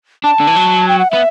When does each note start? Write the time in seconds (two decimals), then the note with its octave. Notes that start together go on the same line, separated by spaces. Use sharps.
0.24 D4 A5
0.40 D3
0.48 E3
0.56 F#3
0.88 G5
0.99 F#5
1.10 B3 E5